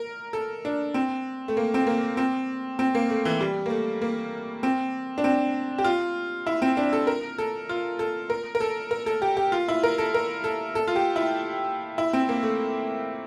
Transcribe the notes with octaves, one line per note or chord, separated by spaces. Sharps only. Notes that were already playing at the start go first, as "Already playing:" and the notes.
Already playing: A#4
A4
D4
C4
A3
A#3
C4
A#3
C4
C4
A#3
A3
E3
G3
A#3
A3
A#3
C4
D4
C4
G4
F4
E4
C4
D4
A4
A#4
A4
F4
A4
A#4
A#4
A4
A#4
A4
G4
G4
F4
E4
A#4
A4
A#4
A4
A4
F4
G4
E4
E4
C4
A#3
A3